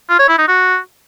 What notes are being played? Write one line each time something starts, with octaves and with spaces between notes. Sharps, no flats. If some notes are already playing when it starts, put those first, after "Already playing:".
F4
C#5
E4
D#4
F#4